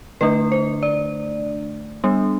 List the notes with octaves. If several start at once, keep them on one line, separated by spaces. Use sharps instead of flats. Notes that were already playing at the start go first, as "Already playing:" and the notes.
D3 A3 D4 B4
C5
D5
G3 B3 D4